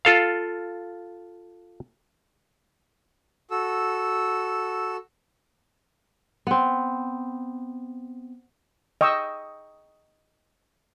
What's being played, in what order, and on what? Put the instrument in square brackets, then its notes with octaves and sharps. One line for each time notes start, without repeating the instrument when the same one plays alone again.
[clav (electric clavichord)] F4 A4 F5
[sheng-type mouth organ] F#4 A4 E6
[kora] B3 C4
[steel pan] D#5 G5 C#6 D#6 E6